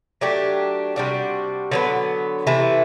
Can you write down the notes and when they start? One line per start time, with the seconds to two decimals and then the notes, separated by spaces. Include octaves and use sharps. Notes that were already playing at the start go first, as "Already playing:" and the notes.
0.21 F#3 A3 D4 G4
0.96 C3 G3 D4 F#4
1.71 D3 F#3 B3
2.47 C3 E3 A3 E4